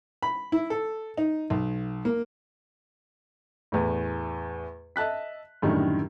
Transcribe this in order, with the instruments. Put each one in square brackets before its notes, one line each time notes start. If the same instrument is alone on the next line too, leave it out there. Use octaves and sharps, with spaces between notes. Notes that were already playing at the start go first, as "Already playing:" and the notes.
[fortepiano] B5
E4
A4
D#4
B1
A#3
[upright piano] E2 A2
D#5 E5 A5 F#6 B6
F#2 A2 D3 D#3 G3